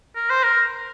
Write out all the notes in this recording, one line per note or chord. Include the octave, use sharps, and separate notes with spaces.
A#4
C5
A#4